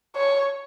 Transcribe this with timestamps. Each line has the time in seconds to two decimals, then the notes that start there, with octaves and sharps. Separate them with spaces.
0.16 C#5